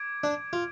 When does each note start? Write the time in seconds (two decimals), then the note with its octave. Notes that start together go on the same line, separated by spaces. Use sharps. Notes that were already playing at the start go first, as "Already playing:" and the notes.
Already playing: D6 G#6 D7
0.24 D4
0.53 F4